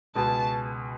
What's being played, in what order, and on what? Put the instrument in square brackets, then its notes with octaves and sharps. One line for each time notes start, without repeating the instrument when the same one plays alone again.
[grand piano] C#2 B2 G#3 B3 [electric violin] A5